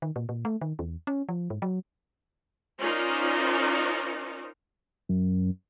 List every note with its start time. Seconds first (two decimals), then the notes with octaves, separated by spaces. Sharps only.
0.02 D#3
0.16 A#2
0.29 A#2
0.45 A3
0.61 D#3
0.79 E2
1.07 C#4
1.29 F3
1.50 G#2
1.62 F#3
2.80 C#4 D#4 F4 A#4 C5 D5
5.09 F#2